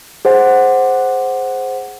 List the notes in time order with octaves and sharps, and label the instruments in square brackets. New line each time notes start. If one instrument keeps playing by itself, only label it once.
[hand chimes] G#4 C5 F#5